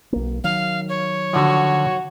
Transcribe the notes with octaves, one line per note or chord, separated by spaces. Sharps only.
B1 A#3
D#3 F#3 F5
C#5
D3 F3 F#4